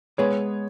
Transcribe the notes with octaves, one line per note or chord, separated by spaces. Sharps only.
G#3 B3 G#4 B4 C#5